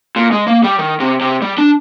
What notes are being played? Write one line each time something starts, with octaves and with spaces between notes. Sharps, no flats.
A#2
G#3
A#3
G3
D#3
C3
C3
G3
D4